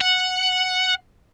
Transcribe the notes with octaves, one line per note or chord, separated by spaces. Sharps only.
F#5